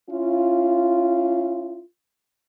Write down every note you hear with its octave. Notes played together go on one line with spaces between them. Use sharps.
C#4 E4 F4